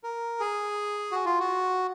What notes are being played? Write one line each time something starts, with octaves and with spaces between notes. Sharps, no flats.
A#4
G#4
F#4
F4
F#4